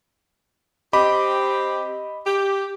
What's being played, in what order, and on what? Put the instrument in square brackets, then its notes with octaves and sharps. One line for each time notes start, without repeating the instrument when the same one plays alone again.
[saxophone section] C4 G4 [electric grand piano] D#5 B5 D6
[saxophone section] G4